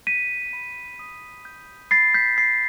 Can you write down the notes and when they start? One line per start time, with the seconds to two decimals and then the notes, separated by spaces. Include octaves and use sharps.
0.07 G6 B6 D#7
0.53 B5
0.99 D#6
1.45 G6
1.91 B5 A6 C7
2.14 G6 B6
2.37 G6 A6 C7